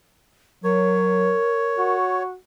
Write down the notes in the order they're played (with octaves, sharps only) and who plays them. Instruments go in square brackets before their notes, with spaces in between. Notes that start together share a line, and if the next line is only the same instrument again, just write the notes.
[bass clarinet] F#3 [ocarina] A#4 [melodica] C#5
[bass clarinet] F#4